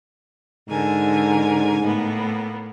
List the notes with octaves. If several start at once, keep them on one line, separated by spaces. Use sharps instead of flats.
G#2 D3 A#4 G#5
A2 A#3 B3